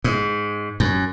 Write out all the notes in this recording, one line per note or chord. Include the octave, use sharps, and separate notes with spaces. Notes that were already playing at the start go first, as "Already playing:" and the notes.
G#2
F#2